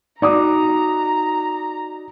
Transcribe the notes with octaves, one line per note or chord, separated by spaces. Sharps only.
D#4 F#4 D5 A#5 D6 D#6